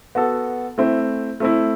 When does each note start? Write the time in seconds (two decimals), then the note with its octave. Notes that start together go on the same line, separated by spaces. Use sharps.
0.15 B3 F#4 A4
0.78 A3 C4 E4
1.40 A3 C4 E4